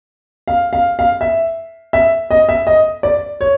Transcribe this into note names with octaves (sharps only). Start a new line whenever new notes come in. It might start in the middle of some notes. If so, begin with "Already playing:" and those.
F5
F5
F5
E5
E5
D#5
E5
D#5
D5
C#5